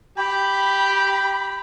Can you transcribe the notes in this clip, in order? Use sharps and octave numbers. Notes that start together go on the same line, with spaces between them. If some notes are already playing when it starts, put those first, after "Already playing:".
G4 G5 B5